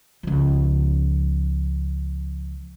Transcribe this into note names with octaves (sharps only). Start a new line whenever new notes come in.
C#2 F3